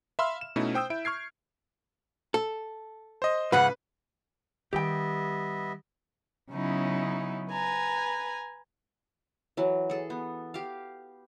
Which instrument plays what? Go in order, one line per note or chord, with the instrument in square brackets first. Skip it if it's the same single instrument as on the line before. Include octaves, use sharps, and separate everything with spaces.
[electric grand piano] E5 F5 B5 C6 E6 F6
E7
B2 A3 C#4 D#4 E4
C5 G5 D#6 E6 G6
E4 E5 D7
C#6 F6 G#6 C7
[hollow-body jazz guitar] A4
[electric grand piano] C5 D#5
[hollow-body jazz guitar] G#2 C#3 F3 [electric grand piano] B4 [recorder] F#5
[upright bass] D#3 G3 [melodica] B3 D#5 E5 [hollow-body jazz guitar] G4 G5
[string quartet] C#3 F#3 B3 C#4 D#4 E4
B4 G#5 A#5
[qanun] E3 F#3
G#4 A4
B3
G4 F5